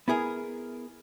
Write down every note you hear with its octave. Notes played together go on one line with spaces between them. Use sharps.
B3 E4 G#4 A#4